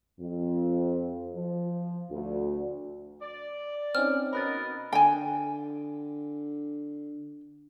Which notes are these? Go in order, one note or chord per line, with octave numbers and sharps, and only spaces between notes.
F2
F3
D2
D5
C4 C#4 D#4 F6
B2 A#4 D#5 B5 F#6 A6
D3 G5 G#5